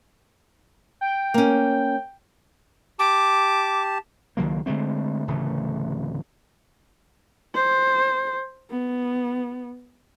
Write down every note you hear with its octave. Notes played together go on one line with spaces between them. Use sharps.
G5
A#3 C#4
G4 A5 D6
C#2 D#3 F#3 A#3
D3 G#3 A3 C4
D1 C#3 E3 A3
C5
B3